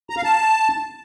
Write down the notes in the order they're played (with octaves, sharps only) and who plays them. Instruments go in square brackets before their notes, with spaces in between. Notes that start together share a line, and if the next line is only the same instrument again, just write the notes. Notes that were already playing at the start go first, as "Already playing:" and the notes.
[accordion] A#5
F5
A5